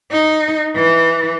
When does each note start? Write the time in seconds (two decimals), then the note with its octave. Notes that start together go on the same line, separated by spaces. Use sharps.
0.11 D#4
0.76 E3